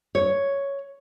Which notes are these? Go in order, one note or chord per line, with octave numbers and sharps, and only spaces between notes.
C#5